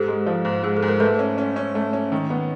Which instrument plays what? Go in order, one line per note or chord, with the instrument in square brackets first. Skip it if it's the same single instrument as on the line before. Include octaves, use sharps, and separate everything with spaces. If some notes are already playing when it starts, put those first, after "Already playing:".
Already playing: [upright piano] G#2 [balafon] G4 A4
[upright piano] G#3
F3
G#2
[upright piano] G#2 [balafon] G#4
[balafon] A4
[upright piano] G#2
[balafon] A#4
[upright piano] A3 [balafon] A4 B4
[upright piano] C#4
C#4
C#4
A3
C#4
D#3
B3